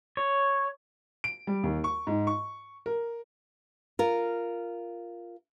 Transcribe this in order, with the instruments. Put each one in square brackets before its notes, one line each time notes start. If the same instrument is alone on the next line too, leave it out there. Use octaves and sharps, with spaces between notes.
[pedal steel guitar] C#5
[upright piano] D7
G3
D#2
C#6
G#2
C#6
A#4
[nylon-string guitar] F4 A#4